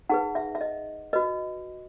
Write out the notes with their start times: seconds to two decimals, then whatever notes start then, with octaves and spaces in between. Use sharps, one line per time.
0.10 D#4 G#4 B4 F#5
0.35 E5
0.55 E5
0.61 D#5
1.13 F#4 B4 D#5